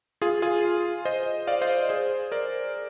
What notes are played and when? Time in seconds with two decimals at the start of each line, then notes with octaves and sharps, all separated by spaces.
0.22 F4 G#4
0.42 F4 G#4
1.05 C5 D#5
1.47 D5 F5
1.62 C5 D#5
1.89 G#4 C5
2.32 A#4 D5